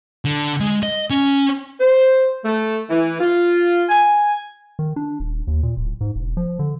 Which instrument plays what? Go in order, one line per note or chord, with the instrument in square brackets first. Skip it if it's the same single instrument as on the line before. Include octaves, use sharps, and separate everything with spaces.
[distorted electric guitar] D3
G#3
D#5
C#4
[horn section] C5
A3
E3
F4
G#5
[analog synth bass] D#3
D4
D#1
D#2
A#2
D1
G#2
E1
F3
D3